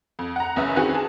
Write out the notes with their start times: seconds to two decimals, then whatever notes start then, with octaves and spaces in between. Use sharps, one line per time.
0.19 F2
0.36 F#5 A#5
0.56 F#1 E2 C#4 B4 E5
0.76 D#3 E3 C4 F#4 G#4 B4
0.94 G#4 A5